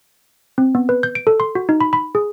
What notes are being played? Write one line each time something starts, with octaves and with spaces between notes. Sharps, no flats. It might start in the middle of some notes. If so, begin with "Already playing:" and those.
C4
B3
B4
G6
D7
A4
C6
F#4
D#4
B5
B5
G#4